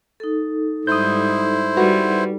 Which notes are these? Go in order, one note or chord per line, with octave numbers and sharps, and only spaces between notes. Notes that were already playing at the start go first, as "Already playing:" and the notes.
D#4 A4
G#2 G3 E4 C5 D#6 G6
G3 F#4 B4